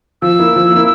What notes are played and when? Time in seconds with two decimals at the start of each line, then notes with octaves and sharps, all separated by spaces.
0.22 F3 E6
0.39 A#3 E4
0.56 F3
0.72 A#3 E4